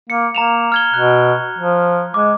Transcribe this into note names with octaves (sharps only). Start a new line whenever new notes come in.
A#3 C#7
A#3 A#5 E7 F7
F6 G#6 G7
B2 F#6
F3
G#3 D6